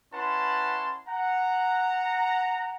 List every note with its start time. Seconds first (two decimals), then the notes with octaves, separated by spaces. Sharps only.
0.12 C#4 E4 B4 F#5 A5 C6
1.07 F#5 A#5